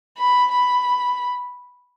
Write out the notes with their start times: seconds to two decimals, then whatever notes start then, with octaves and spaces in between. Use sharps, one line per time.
0.18 B5
0.52 B5